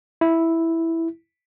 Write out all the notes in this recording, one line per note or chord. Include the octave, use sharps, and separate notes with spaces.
E4